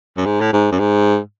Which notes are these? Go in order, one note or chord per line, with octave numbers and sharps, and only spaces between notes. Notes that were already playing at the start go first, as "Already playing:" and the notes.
F#2
G#2
A2
G#2
F#2
G#2